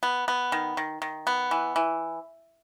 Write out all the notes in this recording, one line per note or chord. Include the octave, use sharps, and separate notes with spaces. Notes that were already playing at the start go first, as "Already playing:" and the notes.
B3
B3
D#3
D#3
D#3
B3
E3
E3